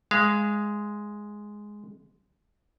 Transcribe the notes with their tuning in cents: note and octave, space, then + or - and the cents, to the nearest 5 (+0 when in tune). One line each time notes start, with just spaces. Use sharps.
G#3 +0 F5 -25